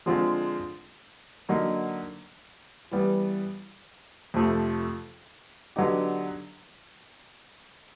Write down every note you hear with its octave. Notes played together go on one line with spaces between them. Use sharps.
D3 F3 G#3 C4 F4
D3 F#3 A#3 D#4
E3 G3 B3
F2 C3 F3 A3
D3 F#3 B3 D#4 G4